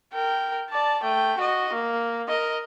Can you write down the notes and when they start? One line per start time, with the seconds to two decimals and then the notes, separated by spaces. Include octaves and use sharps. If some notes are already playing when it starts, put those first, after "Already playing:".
0.13 A#4 G5
0.70 D5 A5
1.03 A3 G5
1.38 F#4 D#5
1.73 A#3
2.29 A#4 D#5